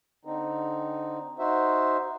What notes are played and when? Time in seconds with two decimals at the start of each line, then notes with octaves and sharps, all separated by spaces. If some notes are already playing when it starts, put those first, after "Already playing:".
0.25 D3 C4 D#4
1.39 D#4 F#4 C5 E5